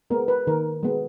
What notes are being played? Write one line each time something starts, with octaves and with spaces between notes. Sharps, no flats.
G#3 B3 A#4
B4
D#3 A#4
G#3 B3